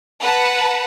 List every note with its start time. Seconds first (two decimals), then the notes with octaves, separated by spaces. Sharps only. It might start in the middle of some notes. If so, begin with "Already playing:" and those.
0.21 B4 F#5 A5 A#5